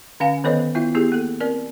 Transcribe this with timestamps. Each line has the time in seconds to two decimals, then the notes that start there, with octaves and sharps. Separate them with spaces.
0.20 D3 C#4 F5 G#5
0.44 D#3 B3 A4 C5 C#5 D#5
0.75 B3 E4 F4 E5
0.95 B3 E4 G4 G#4
1.12 A#3 A4
1.40 C4 A#4 D5